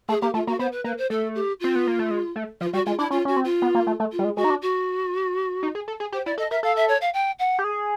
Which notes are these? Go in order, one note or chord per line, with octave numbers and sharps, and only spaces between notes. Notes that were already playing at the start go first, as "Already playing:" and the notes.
A3 G#4
A#3 G4
A3 F4
A#3 F#4
B3 C5
B4
A#3 B4
C5
A3 A4
G4
C4 F4
B3
A#3
A3
G#3
A3
F3 F4
G3 F#4
G#3 F4
D4 E4
C#4 F4
C#4 F#4
C4
F4
B3
A#3
A3
A3
F4
G3
G#3
G#3 F#4
D#4
D4
F#4
D#4
G#4
A4
G#4
G4 C5
E4 D5
A4 D#5
A#4 E5
A4 F5
E5
C#5
F5
G5
F#5
G4
G#4